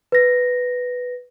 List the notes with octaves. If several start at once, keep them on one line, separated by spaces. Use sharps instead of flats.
B4 A#6